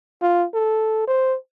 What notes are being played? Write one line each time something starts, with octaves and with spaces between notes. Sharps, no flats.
F4
A4
C5